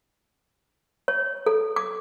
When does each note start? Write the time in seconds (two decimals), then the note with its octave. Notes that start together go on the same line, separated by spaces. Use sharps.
1.08 C#5
1.46 A4
1.76 D6